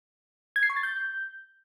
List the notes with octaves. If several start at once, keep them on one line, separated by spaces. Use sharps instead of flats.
G#6
C7
C#6
A6
G6